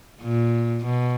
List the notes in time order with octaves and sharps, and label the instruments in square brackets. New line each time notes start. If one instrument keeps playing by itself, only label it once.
[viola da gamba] A#2
B2